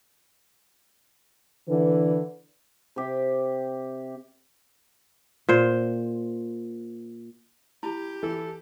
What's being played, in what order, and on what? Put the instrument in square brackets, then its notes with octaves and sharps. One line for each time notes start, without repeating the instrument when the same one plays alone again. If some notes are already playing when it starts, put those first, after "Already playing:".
[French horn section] D3 E3 B4
[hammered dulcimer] C3 G4
[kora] A#2 C5
[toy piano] E4 A5 B5 [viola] G4
[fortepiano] E3 [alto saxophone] A4